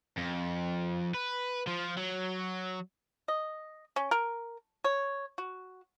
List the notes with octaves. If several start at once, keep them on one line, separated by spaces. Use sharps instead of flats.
F2
B4
F3
F#3
D#5
C#4
A#4
C#5
F#4